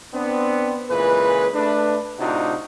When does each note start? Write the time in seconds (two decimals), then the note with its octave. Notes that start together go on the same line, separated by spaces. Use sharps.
0.14 B3 C4 D4
0.90 C#2 A#2 E3 G#4 B4
1.54 A3 D4 B4
2.19 A2 C3 D4 D#4 F4 F#4